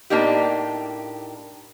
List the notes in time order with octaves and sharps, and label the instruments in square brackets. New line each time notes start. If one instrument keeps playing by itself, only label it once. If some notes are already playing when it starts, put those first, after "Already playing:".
[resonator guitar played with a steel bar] A2 A#3 D4 D#4 G4